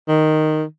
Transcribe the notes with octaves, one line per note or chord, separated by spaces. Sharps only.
D#3